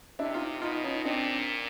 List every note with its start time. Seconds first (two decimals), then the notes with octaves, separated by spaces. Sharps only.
0.19 C3 D4 E4
0.34 D#4 F4
0.62 B2 D#4 F4
0.84 C#4 D#4
1.05 A#2 C4 D4